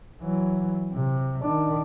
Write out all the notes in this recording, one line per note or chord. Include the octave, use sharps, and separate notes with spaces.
E3 F#3
C3
D#3 D4